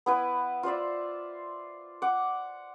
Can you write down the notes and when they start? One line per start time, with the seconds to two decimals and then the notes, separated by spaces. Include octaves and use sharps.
0.06 B3 E4 B4
0.63 F4 C5 D5 E5
2.02 F#5 D6